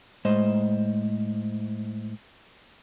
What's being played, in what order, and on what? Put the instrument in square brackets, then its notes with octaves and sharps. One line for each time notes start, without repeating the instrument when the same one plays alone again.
[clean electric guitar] A2 G#3 C5 D#5